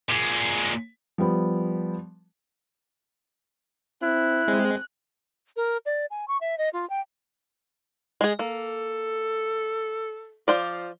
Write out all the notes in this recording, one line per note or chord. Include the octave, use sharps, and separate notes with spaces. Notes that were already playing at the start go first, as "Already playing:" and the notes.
A#2 G#3
F3 G3 B3
C4 E4 F#6
G#3 C4
A#4
D5
G#5
C#6
E5
D#5
F4
G5
G#3 G#4
A#3 A4
F3 F4 C5 D5